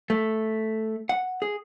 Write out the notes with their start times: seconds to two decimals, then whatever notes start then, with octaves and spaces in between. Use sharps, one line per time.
0.10 A3
1.09 F#5
1.42 G#4